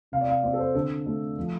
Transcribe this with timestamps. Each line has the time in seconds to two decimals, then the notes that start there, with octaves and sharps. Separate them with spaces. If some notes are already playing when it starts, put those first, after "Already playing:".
0.12 C3 F5
0.21 D5
0.29 F5
0.43 C4 D5
0.53 A4
0.59 C5
0.75 D3 A4
1.06 A3
1.37 F3